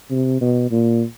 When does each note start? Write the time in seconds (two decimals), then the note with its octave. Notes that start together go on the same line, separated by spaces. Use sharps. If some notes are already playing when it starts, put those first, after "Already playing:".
0.11 C3
0.41 B2
0.71 A#2